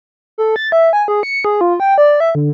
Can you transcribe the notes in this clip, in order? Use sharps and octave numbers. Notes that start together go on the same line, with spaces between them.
A4
A6
E5
G#5
G#4
C#7
G#4
F4
G5
D5
E5
D3